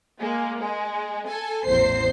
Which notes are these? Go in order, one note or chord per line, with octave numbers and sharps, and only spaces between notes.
G#3 A#3
G#3
A4 G#5
A1 E2 C5 C7